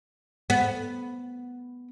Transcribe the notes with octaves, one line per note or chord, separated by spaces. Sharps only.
B3